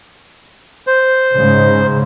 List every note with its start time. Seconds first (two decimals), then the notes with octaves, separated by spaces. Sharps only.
0.87 C5
1.32 G#2 C#3